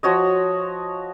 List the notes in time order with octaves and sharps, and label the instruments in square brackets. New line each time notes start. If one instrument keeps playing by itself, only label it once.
[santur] F3 F#4 C#5 D#5